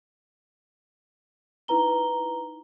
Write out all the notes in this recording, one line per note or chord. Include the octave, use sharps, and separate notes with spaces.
D#4 E4 B4 A#5 G7